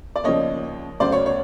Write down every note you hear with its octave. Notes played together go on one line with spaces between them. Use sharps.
D5
D#2 C#3 F3 C#5 D#5
D2 C#3 F#3 C5 D5
C#5
C#5